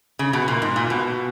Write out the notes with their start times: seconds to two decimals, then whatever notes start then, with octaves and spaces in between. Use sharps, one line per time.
0.19 C#3
0.33 B2
0.48 A#2
0.62 G#2
0.76 A#2
0.90 B2